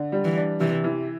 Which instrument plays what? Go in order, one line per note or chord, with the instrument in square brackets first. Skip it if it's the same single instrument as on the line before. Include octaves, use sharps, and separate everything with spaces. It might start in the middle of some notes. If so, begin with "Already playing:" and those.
Already playing: [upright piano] D3
G3
[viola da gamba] E3
[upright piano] D4
[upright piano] C3 [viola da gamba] E3
[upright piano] E3